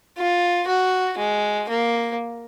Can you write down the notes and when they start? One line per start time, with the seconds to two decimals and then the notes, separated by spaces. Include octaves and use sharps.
0.18 F4
0.67 F#4
1.18 G#3
1.69 A#3